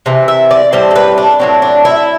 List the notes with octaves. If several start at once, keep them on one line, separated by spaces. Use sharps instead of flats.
C3 E3
E5
D5
A2 G3 C4 C5
A4
B4
D4
A2 F#3 C4 D4
D4
E4